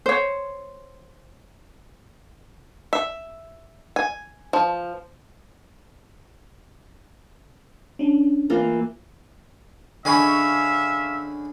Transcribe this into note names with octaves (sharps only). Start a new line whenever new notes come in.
C5 C#5
E5
G#5
F3
C#4 D4
E3 A#3 F4
D3 G#3 C#4 E5 F5 G#5 B5 C#6